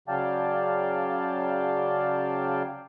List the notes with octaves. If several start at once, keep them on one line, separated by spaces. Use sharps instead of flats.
C#3 F#3 D5 F5 G5 A5